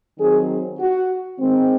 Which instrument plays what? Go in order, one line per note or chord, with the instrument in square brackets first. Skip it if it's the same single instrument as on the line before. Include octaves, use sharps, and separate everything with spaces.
[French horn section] D#3 F#3 C4 G#4
F#4
D#3 G#3 C4